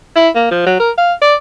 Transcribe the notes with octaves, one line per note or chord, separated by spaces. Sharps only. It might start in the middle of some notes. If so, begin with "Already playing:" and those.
E4
A#3
F3
F#3
A#4
F5
D5